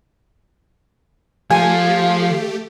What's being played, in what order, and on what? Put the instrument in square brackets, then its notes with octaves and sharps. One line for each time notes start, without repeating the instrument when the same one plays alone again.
[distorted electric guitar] F3 [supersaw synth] A3 G4 [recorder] F5 [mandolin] G#5